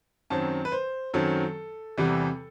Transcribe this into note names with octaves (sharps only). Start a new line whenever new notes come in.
F#2 D#3 F#3 C4 A5
B4
C5
F#2 D#3 F#3 C4 A4
E2 C3 E3 G3